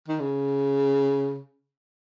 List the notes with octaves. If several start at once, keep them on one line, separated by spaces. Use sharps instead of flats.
D#3
C#3